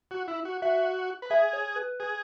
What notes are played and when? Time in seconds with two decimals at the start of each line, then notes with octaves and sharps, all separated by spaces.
0.11 F#4
0.28 E4
0.45 F#4
0.62 F#4 E5
1.22 B4
1.30 G#4 E5
1.53 C#5
1.76 B4
2.00 G#4